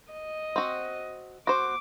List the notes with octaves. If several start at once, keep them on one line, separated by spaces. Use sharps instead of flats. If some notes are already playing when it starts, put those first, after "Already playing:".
D#5
C4 F#4
F#4 C5 D6